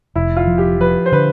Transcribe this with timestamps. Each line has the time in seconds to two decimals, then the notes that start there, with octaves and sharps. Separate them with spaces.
0.16 F1 E4
0.36 F4
0.47 F3
0.58 G4
0.81 F3 B4
1.06 C5
1.12 D3 B4